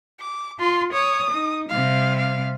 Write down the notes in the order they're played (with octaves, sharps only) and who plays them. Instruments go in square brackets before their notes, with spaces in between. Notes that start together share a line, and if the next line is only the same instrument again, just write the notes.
[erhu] D6
[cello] F4 [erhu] C6
[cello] C#5 [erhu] D#6
[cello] D#4
[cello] C3 G3 [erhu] F5
[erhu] F5